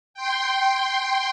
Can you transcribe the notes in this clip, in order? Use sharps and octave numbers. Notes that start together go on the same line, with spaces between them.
G5 C6